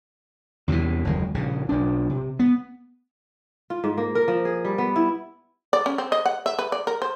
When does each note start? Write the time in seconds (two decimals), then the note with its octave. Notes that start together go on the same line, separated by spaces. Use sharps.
0.68 E2 C3 D#3 E3
1.05 F#1 D#2 G#3
1.34 A#1 C#3
1.69 B1 D4
2.09 C3
2.39 B3
3.70 F4
3.84 G#2
3.98 A#3
4.15 A#4
4.28 F3
4.45 G#4
4.65 G3
4.78 B3
4.96 E4
5.73 D5
5.86 C#4
5.98 C4
6.12 D#5
6.26 F#5
6.46 E5
6.59 B4
6.72 D5
6.87 A#4
7.02 C5